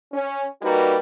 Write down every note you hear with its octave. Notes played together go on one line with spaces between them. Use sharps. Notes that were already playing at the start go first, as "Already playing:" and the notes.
C#4
G3 A#3 D#4 F#4 A#4 B4